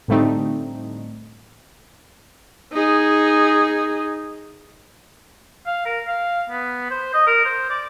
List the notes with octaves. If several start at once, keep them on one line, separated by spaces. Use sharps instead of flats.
A2 D3 G3 A3 C4 D#4
D#4 G#4
F5
A#4
F5
B3
C5
D#5
A#4
C5
D5